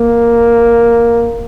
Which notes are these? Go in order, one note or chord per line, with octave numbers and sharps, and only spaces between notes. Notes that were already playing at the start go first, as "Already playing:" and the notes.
Already playing: A#3